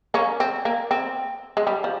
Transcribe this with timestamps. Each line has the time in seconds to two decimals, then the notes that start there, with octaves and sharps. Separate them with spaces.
0.14 A#3 C#4
0.40 C4
0.65 A#3
0.91 C4
1.57 G#3
1.67 G3
1.84 F3